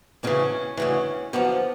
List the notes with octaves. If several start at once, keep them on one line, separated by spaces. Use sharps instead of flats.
D2 C#3 E3 C#4
D2 C#3 E3
F#2 D3 F3 B3